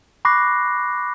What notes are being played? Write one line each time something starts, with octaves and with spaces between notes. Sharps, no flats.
B5 C#6 D6 F#6 A#6 C7